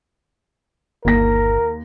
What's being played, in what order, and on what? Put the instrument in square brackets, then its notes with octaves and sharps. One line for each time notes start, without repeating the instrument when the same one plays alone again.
[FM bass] G1 [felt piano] D#2 A#6 [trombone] A#4